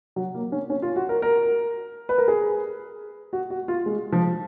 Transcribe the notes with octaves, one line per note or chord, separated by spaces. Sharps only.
F#3
A#3
C#4
C#4
F4
F#4
A#4
A#4
B4
A#4
G#4
F#4
F#4
F4
G#3
F3